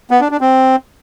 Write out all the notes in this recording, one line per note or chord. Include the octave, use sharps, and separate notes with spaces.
B3
D4
D4
C4